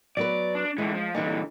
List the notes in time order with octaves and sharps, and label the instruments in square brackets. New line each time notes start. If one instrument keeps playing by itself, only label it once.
[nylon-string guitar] F#3 B3 B4 [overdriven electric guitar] D5
[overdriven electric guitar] D4
[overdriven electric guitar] D3 E3 [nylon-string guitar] G#3
[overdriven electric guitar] F3
[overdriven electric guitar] A#2 D3 [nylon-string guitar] E3 G3 D#4